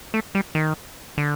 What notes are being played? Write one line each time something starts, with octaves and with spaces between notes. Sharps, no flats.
A3
G3
D#3
D3